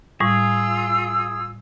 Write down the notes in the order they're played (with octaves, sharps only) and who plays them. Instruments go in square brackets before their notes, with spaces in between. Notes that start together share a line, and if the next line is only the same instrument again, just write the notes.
[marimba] A2 G3 [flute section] F4 E6 [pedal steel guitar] G#4